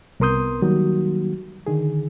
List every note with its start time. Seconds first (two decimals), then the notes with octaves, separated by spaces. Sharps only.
0.20 C2 B3 A#4 C6 D#6 G6
0.62 D#3 F#3 G3 A#3 F#4
1.67 D3 D#3 G#4